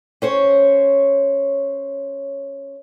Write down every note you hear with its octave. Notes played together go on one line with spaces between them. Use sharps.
C#4 C5 C#5